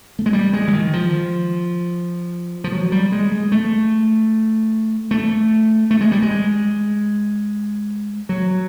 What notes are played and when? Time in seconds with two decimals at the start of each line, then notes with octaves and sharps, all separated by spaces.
0.19 A3
0.26 G#3
0.33 G3
0.53 G#3
0.68 E3
0.73 D#3
0.93 F3
2.64 F3
2.72 F#3
2.92 G3
3.12 G#3
3.32 G#3
3.52 A3
5.11 A3
5.91 A3
6.01 G#3
6.12 G3
6.22 G#3
8.29 F#3